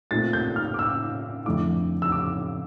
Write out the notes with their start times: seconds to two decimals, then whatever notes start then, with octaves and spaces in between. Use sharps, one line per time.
0.11 A#2 A3 C4 F4 A6
0.33 G6
0.56 F6
0.74 D6
0.79 E6
1.46 F2 D3 A3 E4 D6
2.02 E6
2.12 D6